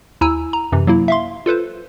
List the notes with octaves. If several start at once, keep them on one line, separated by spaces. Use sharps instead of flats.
D#2 E4 G#5 A#5 E6
A#5
F#2 C3 E3
F#3 A#3 E4
E5 F5 C6
F4 A4 B4 C5